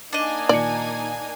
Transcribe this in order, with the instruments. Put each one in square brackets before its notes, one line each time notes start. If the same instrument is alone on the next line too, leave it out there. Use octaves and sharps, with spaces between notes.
[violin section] A#3 D#4 G#5 [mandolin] D4 D#5
[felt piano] A#2 D#3 C#7 [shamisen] D5